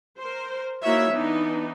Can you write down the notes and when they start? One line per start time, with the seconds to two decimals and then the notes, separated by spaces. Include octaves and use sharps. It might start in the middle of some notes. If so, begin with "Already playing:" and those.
0.19 A#4 C5
0.83 A#3 D#4 E4 F#4 C#5 E5
1.12 E3 B3 D4 D#4